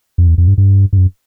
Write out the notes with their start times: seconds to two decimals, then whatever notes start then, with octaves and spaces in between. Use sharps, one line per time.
0.18 F2
0.28 E2
0.38 F2
0.48 G2
0.58 G2
0.93 G2
0.97 F#2